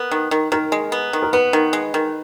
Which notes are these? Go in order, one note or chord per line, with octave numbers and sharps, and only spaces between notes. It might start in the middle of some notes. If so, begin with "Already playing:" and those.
Already playing: B3 A#4
D#3
D#3
D#3 A#4
G#3
B3
D#3
A#4
B3 B4
D#3
G#3
D#3